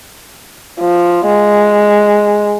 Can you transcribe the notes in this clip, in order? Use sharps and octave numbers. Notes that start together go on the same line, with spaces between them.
F3
G#3